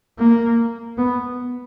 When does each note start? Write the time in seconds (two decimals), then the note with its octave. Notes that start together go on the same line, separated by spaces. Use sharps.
0.19 A#3
0.98 B3